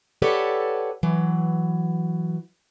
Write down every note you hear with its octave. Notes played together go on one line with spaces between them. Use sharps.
G4 A4 B4 C#5 D5 F#5
E3 F#3